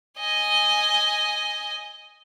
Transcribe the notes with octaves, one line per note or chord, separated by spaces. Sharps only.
D#5 G#5